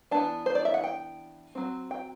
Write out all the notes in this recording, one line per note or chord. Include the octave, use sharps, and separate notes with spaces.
E3 B3 D4 A5
C5
D5
E5
F#5
G5
F#3 C4
G5